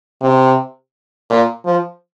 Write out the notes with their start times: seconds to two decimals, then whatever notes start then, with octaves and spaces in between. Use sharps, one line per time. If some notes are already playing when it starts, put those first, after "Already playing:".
0.22 C3
1.30 A#2
1.65 F3